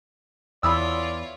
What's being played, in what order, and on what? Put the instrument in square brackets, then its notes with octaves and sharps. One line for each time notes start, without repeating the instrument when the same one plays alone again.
[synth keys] E2 E4 [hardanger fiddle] F4 C#5 [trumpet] D5 [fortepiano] B5 D#6 E6